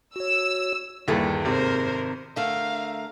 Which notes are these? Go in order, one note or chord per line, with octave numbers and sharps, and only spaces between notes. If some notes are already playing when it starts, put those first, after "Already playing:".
F#4 C#5 E6
G1 D#2 G3 E4 G#4 A4
G#1 C3 A#4 C5
D3 A3 A#4 F5